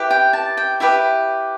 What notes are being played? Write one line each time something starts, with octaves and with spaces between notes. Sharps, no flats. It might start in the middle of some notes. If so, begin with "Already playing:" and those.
Already playing: E4 G4 B4
G5
A5
G5
E4 G4 B4 E5